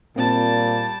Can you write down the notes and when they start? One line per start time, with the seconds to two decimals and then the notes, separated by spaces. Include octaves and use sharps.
0.16 A#2 G3 A#3 C4 A5